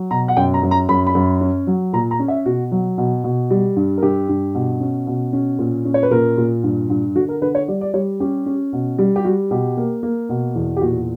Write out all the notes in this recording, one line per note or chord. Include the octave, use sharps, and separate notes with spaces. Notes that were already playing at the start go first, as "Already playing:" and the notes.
Already playing: F#3
B2 A#5
F#5
F#2 G5
A#5
F#2
A#5
F#2 B5
B5
F#2
C#4
F#3
A#2 A#5
A#5
C#4
E5
B2 F#4
F#3
B2
B2
G3
G2
A#4
G2 G4
G2
B2
C#4
B2
C#4
A#2
C#4
C#5
B4
A#2 A#4
A#2
G2
G2
D3 F#4
A#4
D3 B4
C#5
G3 D5
D5
G3 C#5
C#4 G4
C#4
B2
G3
G4
G3 F#4
B2 G4
A#3
A#3
B2
E2
G4
A#2 F#4